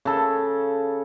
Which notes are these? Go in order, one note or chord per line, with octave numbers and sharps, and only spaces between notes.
C#3 A4